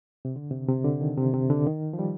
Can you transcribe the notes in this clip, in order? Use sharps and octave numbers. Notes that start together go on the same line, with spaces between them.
C3
D3
C3
C3
D3
D#3
C3
C3
D3
D#3
F3
G3